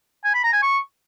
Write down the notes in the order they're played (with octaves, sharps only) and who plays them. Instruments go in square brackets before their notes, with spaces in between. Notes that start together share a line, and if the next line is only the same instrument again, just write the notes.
[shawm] G#5
B5
A#5
G#5
C#6